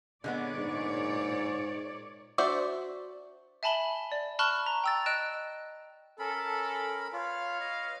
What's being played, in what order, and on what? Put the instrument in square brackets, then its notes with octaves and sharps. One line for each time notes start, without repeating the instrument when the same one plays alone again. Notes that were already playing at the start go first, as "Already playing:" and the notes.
[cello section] A#2 C#5 D5 [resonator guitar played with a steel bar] D3 G#3 B3
[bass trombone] G#2
[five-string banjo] D4 F#4 C5 D5 E5
[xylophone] E5 G#5 A5 B5 F#7 G7
D5
A5 B5 C#6 F6 F#6 G7
A#5
G5 E6 A6
D#5 F#6 D7 E7
[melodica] C#4 A#4 B5 [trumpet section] A4
[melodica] F4 [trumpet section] B4 C#5 F5
[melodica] D#5